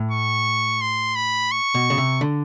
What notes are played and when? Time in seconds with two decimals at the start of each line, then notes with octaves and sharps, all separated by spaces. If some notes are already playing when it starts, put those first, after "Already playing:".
Already playing: A2
0.11 C#6
0.81 C6
1.15 B5
1.51 C#6
1.74 B2
1.90 C#3
1.98 C3
2.21 D3